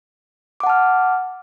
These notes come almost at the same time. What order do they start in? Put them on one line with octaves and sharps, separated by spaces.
D6 F#5 A5 F6